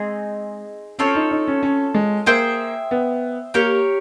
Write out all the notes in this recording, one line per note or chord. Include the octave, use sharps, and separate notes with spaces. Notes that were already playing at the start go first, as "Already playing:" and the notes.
Already playing: G#3 C4 D#4 G#4
C4 C#4 F4 A4 C#5
D#4
D#4
C#4
C#4
G#3
A#3 G#4 C5 E5 G5
B3
A#3 G4 A#4 C#5